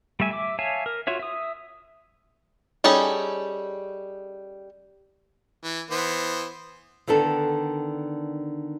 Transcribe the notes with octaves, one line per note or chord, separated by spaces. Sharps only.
G3 A3 E5 G#5
E5 D6
C#5 E5 F5 G#5 A5
A#4
F4 F#4 C#5 E5
E5 D#6
G3 C#4 D#4 G#4 A4
E3
E3 B3 C5
D3 D#3 B3 D4 A4